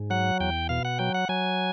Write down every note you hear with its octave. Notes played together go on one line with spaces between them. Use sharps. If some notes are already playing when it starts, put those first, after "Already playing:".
Already playing: G#2
F#3 F#5
E2 G5
B2 F5
F#5
F#3 G5
F#5
F#3 G#5